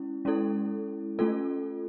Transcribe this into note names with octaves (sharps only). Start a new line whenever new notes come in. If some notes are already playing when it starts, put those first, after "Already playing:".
Already playing: G#3 C#4 E4
G#3 C#4 E4 A4
A3 C#4 F4 A4